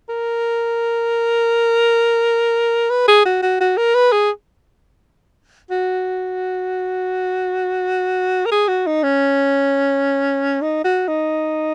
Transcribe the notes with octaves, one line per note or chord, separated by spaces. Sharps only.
A#4
B4
G#4
F#4
F#4
F#4
A#4
B4
G#4
F#4
A#4
G#4
F#4
D#4
C#4
D#4
F#4
D#4